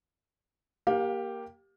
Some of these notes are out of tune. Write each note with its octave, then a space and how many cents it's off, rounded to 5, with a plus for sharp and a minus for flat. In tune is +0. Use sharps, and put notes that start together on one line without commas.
A#3 +0 G4 +0 F5 +30